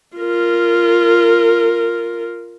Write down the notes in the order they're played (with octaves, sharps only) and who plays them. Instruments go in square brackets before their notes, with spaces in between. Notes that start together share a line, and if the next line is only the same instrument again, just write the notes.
[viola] F4 A#4